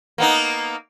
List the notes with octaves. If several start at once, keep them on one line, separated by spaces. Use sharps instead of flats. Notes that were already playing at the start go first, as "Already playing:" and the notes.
A#3 B3 D#4